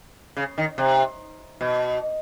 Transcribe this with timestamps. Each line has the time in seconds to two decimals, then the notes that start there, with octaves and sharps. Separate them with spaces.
0.37 C#3
0.58 D#3
0.78 C3
1.61 B2